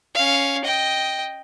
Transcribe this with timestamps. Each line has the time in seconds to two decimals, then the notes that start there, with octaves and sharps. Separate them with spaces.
0.15 C#4 F5
0.65 D#5 G5